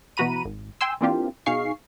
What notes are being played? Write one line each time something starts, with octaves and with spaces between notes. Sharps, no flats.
B2 E3 F#4 A#5 B5 D#7
G#1
G5 G#5 C6 E6
E3 A#3 C4 D4 F4 G4
B2 D#4 G#4 F5 C#6 C7